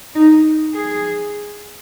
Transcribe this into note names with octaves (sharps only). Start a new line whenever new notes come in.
D#4
G#4